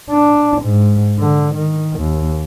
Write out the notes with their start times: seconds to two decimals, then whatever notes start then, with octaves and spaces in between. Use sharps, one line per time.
0.10 D4
0.62 G#2
1.20 D3
1.55 D#3
1.99 D#2